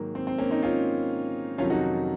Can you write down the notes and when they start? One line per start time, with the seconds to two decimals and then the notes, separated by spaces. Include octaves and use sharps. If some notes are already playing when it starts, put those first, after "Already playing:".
Already playing: G#2 D#3 F#3 A#3
0.15 C4
0.27 C4
0.38 A#3 C#4
0.51 C4 D#4
0.62 C#4 F4
1.58 F2 C3 D#3 F#3 C#4 F4
1.70 D#4 F#4